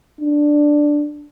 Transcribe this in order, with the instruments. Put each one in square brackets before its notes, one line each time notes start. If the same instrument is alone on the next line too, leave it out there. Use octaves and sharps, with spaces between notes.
[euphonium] D4